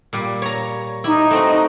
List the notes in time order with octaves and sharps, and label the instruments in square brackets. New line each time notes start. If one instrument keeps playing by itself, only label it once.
[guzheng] A#2 G3
C#5 A#5
[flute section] D#4 [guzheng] E4 G4
[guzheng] A3 C4 F#4